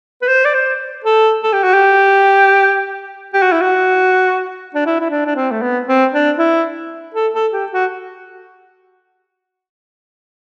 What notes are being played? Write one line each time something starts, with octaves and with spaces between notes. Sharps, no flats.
B4
C5
D5
C5
A4
A4
G4
F#4
G4
G4
F#4
E4
F#4
D4
E4
E4
D4
D4
C4
A3
B3
C4
D4
E4
A4
A4
G4
F#4